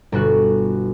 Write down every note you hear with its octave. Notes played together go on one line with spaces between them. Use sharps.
G1 B2 F#4 F#6